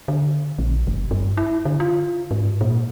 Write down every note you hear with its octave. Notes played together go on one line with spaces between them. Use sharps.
D3
A#1
F#1
G2
E4
D3
F4
G#2
A#2